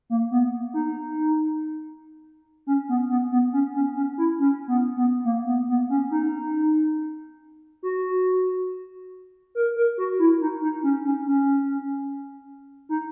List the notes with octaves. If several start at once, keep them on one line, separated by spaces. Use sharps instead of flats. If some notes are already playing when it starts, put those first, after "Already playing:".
A#3
B3
D#4
C#4
B3
B3
B3
C#4
C#4
C#4
E4
C#4
B3
B3
A#3
B3
B3
C#4
D#4
F#4
A#4
A#4
F#4
E4
D#4
D#4
C#4
C#4
C#4
D#4